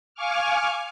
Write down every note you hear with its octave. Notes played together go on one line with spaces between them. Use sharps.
F5 G#5 C#6 D6 F6